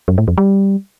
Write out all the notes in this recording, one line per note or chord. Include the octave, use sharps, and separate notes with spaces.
F#2
A2
F2
G3